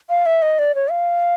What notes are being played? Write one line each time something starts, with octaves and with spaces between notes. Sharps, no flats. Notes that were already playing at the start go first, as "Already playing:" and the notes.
F5
E5
D#5
D5
C#5
F5